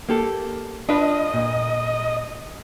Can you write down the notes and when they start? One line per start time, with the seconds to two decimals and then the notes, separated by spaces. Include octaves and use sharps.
0.09 A#3 G4 A4
0.89 D4 F4 B4 D#5
1.34 A#2